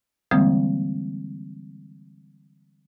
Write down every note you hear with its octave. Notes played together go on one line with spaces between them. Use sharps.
D3 E3 G3 G#3 A#3 C4